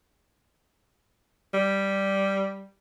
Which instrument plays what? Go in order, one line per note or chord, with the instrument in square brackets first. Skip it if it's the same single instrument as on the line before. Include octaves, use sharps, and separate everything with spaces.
[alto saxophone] G3